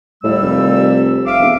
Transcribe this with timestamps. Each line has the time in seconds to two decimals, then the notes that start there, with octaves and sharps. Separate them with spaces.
0.24 D#2 A2 G3 E6
0.42 F1
1.27 E5 F5 D6
1.40 E1